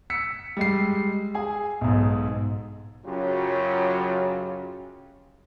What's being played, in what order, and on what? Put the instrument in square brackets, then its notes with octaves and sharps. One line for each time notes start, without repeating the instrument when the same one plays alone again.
[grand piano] E6 B6 C#7
G3 G#3 C7
G#4 G#5
B1 G#2
[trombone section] F#2 C#3 F#3 F4 G4